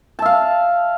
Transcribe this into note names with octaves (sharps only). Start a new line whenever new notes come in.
E5 F5 A5